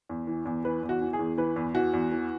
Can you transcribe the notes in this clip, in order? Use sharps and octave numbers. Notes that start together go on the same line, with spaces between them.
E2
E3
E2
E3 B4
E2
F#4
E3
G#4
E2
E3 B4
E2
E3 F#4
E2
E3